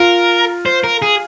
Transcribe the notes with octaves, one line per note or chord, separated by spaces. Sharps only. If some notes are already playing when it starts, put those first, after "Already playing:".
Already playing: F4 A#4
C5
A#4
G#4